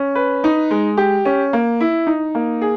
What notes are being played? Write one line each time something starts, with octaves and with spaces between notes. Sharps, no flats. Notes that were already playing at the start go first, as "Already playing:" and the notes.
Already playing: C#4
B4
D#4
G#3
G4
C#4
A#3
E4
D#4
A#3
G#4